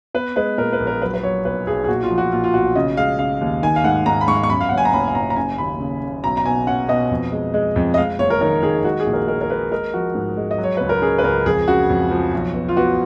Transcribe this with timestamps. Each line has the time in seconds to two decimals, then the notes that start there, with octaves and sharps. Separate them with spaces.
0.14 B3 B4
0.36 G#3 B4
0.58 A#2 A#4
0.73 B4
0.80 A#1
0.87 A#4
1.02 F#3 B4
1.14 B4
1.23 F#3 C#5
1.45 B1 B4
1.67 B1 G#4
1.84 G#4
1.88 A#2 F#4
2.03 F4
2.10 F3
2.18 F#4
2.32 A#2 F4
2.44 F4
2.54 B1 F#4
2.75 C#3 D#5
2.97 G#3 F5
3.19 C#3 F5
3.41 D#2
3.63 D#3 G#5
3.76 F5
3.84 G#2 F#5
4.06 G#2 A#5
4.21 B5
4.28 G#2 C#6
4.43 C#6
4.50 F#2 B5
4.61 F5
4.69 F#1 F#5
4.78 G#5
4.85 A#5
4.93 F#1 B5
5.08 G#5
5.15 F#1 A#5
5.30 A#5
5.36 C#3 G#5
5.58 D#2 B5
5.80 C#3
6.02 C#3
6.23 B1 A#5
6.37 A#5
6.46 B2 G#5
6.67 C#4 F#5
6.88 B2 D#5
7.11 F2
7.32 G#3
7.54 G#3
7.76 F2
7.94 D#5
7.97 G#3 F5
8.19 F#1 C#5
8.30 A#4
8.41 D#3 A#4
8.63 D#3 G#4
8.84 G#3 F#4
9.00 G#4
9.06 A#1
9.13 A#4
9.28 G#3 A#4
9.41 A#4
9.50 G#3 B4
9.72 G#3 A#4
9.94 F3 F#4
10.15 G#2
10.37 G#3
10.51 D#5
10.58 F#3
10.64 C#5
10.77 C#2 B4
10.89 A#4
11.02 C#4 G#4
11.18 B4
11.24 C#2 A#4
11.46 F2 G#4
11.68 C#3 F#4
11.89 F2
12.11 F3
12.33 B1
12.54 B3
12.69 F4
12.77 B3 F#4